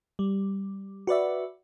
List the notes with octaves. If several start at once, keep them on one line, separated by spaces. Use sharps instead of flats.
G3
F#4 B4 D5 E5